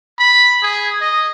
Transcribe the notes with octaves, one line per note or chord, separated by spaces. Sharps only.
B5
G#4
D#5